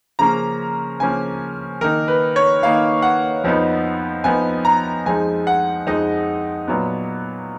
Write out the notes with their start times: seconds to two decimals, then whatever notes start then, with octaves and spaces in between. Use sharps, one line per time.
0.19 C#3 F3 A#3 C#4 A#5
1.00 C#3 F3 A#3 C#4 G#5
1.81 D#3 A#3 D#4 A#4
2.08 B4
2.36 C#5
2.63 D#3 A#3 D#4 F5
3.02 F#5
3.44 F2 F3 B3 D#4
4.24 F2 F3 B3 D#4 G#5
4.65 A#5
5.06 F2 F3 G#3 D#4 G#5
5.47 F#5
5.87 F2 F3 G#3 D#4 D#5
6.68 A#2 F#3 B3